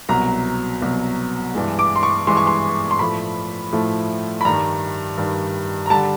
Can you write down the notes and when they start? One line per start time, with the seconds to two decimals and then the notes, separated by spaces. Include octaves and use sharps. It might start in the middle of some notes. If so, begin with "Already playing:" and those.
0.09 C2 B2 F#3 A#5
0.82 C2 B2 F#3
1.54 G2 E3 G#3
1.79 D6
1.96 C6
2.03 C#6
2.27 G2 E3 G#3 C6
2.37 C#6
2.47 C6
2.91 C6
2.99 A2 F3 A3 B5
3.73 A2 F3 A3
4.41 B5
4.45 G2 D#3 G3 A#5
5.17 G2 D#3 G3
5.86 A#5
5.90 D3 G3 A5